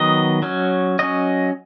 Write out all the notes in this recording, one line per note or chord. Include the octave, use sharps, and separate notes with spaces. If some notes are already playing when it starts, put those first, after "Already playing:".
Already playing: D#3 F#3 B3 D#5
F#3 C#4
F#3 C#4 D#5